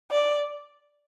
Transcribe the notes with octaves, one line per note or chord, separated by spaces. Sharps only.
D5